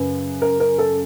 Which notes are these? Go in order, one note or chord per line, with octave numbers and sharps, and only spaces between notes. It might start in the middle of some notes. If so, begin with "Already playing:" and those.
Already playing: F#2 C#3 B4
A#4
A#4
A4